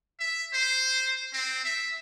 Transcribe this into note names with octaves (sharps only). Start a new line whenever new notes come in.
E5
C5
C4
E5